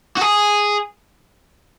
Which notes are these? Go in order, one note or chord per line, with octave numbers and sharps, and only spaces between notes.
F#4
G#4